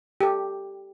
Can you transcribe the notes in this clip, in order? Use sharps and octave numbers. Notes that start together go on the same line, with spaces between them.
G4 A4